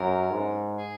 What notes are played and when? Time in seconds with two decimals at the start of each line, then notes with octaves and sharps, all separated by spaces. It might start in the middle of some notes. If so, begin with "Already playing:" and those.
Already playing: F#2 A#4
0.31 G#2
0.78 G#4